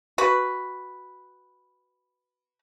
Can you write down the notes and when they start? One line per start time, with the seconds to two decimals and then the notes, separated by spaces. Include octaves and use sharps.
0.18 F#4 B4